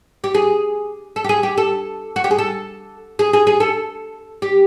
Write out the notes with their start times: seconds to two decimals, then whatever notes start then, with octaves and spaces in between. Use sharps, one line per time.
0.24 G4
0.34 G#4
1.16 A4
1.24 G4
1.29 G#4
1.43 G4
1.57 A4
2.16 F#4
2.24 G4
2.31 G#4
2.38 A4
3.19 G#4
3.33 G#4
3.47 G#4
3.60 A4
4.42 G4